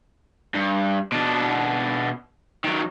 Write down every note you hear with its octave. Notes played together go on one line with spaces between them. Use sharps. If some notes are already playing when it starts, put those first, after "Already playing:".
G2
B2 D4
D#3 F#3